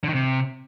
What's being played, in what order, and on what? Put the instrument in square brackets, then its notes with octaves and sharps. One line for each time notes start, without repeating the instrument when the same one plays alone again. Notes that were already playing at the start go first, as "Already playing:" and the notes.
[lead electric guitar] D3
D#3
C3